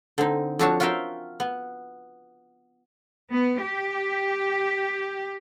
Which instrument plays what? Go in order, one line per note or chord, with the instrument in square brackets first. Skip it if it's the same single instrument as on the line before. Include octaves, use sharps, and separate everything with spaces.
[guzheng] D3 C4 D#4
F2 C4 D4 F#4 C#5 A5
F4 F#4 A#4 E5 F5 G5
B3
[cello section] B3
G4